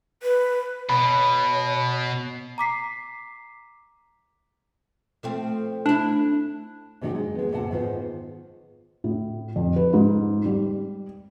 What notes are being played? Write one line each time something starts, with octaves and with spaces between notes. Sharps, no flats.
B4
B2 C#5 B5
A#5 D6 B6 C7
F3 A3 C4
A3 D4 E4
G#2 C3 D#3 D4 F#4
G#3
G#3 B3
D2 G#2 C3 D5 F#5 A5
G#2 D#3 B3 F4 C5
A2
F2
B4
G#2
G3